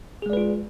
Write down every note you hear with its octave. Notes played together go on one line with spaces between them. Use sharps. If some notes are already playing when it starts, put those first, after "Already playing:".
G#3 F4 G#4 B4 D5